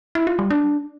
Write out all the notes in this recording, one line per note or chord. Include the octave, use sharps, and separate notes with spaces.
E4
F4
G3
D4